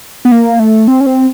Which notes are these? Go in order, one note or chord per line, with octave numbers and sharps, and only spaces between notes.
B3
A#3
A3
C4
C#4
C4